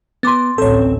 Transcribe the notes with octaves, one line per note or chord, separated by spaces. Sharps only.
B3 C6 D6 A6
A1 D2 C4 A4 C#5